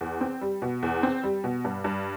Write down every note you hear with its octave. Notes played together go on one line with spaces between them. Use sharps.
E2
C4
G3
B2
E2
C4
G3
B2
G2
G2